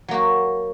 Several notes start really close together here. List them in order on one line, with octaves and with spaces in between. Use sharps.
F#3 A#3 F#4